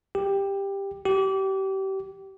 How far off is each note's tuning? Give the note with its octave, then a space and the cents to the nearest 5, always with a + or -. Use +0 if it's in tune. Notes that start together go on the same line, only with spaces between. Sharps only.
G4 +10
G4 -30